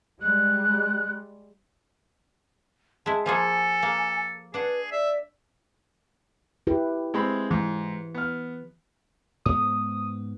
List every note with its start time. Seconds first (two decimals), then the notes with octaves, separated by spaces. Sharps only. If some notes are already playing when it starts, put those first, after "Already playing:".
0.21 G3 G#3 F#6
3.06 G#3 E4 A5
3.26 F3 A#3 G#4 A4 G#5
3.83 A#3
4.54 D4 G#4 B4 F#5
4.92 D5 E5
6.67 E4 G4 B4
7.14 G#3 C4 B5
7.51 G#2 E3
8.14 B3 F6
9.46 G#2 B3 D#6